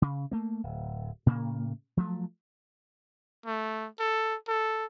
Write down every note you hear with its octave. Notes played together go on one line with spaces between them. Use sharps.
C#3
A3 A#3
D1
A2 C#3 A#3
F3 F#3 A3
A3
A4
A4